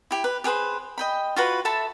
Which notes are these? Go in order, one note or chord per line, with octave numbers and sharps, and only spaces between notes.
E4 G4
B4
G4 G#4 B4 C5
D#5 G5 B5
F4 F#4 B4
A4 E5 A5 B5